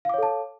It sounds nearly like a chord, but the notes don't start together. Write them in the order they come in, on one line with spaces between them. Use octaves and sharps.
F5 D6 C#5 A4 A5